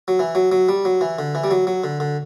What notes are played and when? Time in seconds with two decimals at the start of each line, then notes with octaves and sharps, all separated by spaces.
0.08 F#3
0.19 E3
0.35 F#3
0.52 F#3
0.69 G3
0.85 F#3
1.01 E3
1.19 D3
1.35 E3
1.44 G3
1.51 F#3
1.67 F#3
1.84 D3
2.00 D3